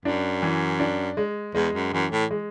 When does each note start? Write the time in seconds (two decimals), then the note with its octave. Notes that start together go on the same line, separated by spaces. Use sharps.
0.05 F#2 D4
0.42 E3
0.80 D4
1.17 G#3
1.55 E2 G#3
1.74 F#2
1.93 F#2 E3
2.12 A2
2.31 G#3